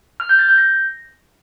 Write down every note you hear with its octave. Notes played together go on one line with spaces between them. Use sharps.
F6
G6
A6
G6
A#6